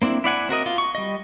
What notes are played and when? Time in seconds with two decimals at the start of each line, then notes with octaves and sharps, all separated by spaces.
0.02 A#3 C4 D4 E4
0.24 E4 D5 F#5 G#5
0.49 C4 F#4 A#4 D#5
0.66 F4
0.78 C#6
0.95 G3 D#5